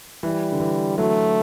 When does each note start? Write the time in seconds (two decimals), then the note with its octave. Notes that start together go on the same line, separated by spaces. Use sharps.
0.23 E3 G3
0.52 D3
0.60 E3
0.98 F#3 A3